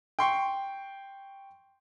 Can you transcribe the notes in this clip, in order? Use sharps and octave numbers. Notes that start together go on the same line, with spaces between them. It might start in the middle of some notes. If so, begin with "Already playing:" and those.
G5 C6 C#6